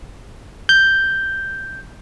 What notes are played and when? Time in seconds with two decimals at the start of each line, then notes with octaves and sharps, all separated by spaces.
0.69 G6